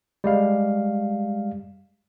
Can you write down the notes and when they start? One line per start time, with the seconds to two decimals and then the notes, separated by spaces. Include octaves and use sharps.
0.24 G3 G#3 F5